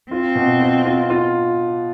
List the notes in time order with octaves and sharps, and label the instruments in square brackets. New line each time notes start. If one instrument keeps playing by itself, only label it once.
[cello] C4 [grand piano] F4
[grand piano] B2
F4
F4
F4